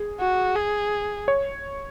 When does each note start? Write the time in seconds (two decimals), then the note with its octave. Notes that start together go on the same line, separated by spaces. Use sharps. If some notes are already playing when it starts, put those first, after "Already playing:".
Already playing: G#4
0.20 F#4
0.56 G#4
1.28 C#5